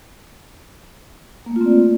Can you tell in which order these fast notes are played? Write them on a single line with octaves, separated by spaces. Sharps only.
A#3 A3 F4 C4 D5